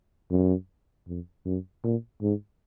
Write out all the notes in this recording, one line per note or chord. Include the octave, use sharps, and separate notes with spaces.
F#2
F2
F#2
A#2
G#2